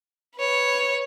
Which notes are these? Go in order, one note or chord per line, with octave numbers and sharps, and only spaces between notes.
B4 C#5